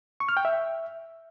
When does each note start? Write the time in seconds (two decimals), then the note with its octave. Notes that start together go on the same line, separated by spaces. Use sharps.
0.20 C#6
0.29 F6
0.37 G5
0.45 E5